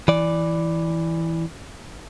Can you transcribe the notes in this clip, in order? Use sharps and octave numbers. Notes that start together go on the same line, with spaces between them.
E3 D5